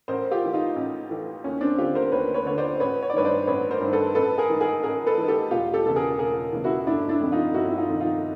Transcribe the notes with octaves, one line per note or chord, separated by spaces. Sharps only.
A1 A#4 C5
F4 G4
A2 E3
D#4 F4
A1
A2 E3
D#2 C#4
C4 D4
D3 F4 G4
A#4 C5
D#2 B4 C#5
B4 C#5
D3 C#5
C5 D5
A1 B4 C#5
C#5
D5
G2 D#3 B4 C#5
C5 D5
A1 B4 C#5
A#4 C5
G2 D#3
A4 B4
A1 A4 B4
G#4 A#4
G#2 E3
G#4 A#4
A1 G#4 A#4
A4 B4
G#2 E3
G4 A4
E1 F4 G4
G4 A4
E2 C#3 E3 A4
G#4 A#4
E1 G#4 A#4
E2 C#3 E3
E4 F#4
G1 D4 E4
D4 E4
F2 C3 D#3
D#4 F4
G1 E4 F#4
E4
D#4 F4
F2 C3 D#3
D#4 F4